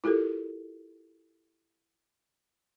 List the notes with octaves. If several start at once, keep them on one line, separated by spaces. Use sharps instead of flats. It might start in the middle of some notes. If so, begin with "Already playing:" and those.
E4 F4 G4 A4 A#4